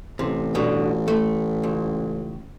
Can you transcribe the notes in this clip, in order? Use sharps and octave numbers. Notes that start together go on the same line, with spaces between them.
A1 C3
G2 B2 D3
A3
C#2